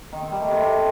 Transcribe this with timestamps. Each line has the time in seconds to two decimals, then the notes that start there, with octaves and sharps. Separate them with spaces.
0.13 D#3
0.22 C4
0.32 G3
0.41 A3
0.51 C3